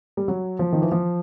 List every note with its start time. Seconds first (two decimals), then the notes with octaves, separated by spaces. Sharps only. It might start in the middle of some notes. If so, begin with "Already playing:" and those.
0.17 G3
0.28 F#3
0.59 F3
0.72 D#3
0.82 E3
0.92 F3